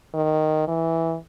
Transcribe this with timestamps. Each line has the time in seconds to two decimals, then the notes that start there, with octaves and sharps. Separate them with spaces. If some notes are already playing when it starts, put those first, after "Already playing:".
0.14 D#3
0.68 E3